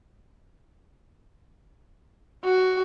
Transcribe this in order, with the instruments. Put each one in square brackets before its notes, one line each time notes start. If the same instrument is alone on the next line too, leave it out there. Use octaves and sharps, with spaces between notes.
[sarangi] F#4